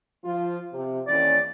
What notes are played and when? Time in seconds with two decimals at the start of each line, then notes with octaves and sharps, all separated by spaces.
0.23 F3 F4
0.72 C3
1.08 D#2 E3 C#4 D5